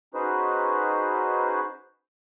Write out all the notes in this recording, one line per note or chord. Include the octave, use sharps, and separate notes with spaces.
C#4 D#4 F#4 G#4 B4 C5